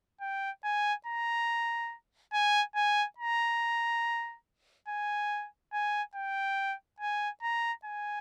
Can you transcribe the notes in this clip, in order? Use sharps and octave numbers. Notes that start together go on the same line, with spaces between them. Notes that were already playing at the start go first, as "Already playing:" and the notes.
G5
G#5
A#5
G#5
G#5
A#5
G#5
G#5
G5
G#5
A#5
G#5